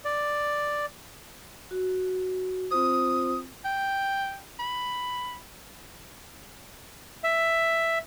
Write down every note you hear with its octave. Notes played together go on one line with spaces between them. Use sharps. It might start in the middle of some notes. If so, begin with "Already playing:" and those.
D5
F#4
C4 F4 C5 D#6
G5
B5
E5